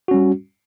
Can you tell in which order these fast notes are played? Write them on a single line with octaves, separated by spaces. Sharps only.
F#4 C#4 G3